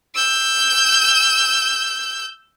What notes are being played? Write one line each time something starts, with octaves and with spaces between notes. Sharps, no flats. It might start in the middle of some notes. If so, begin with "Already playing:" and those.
E6 G6